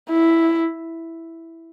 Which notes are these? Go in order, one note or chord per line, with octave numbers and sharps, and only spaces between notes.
E4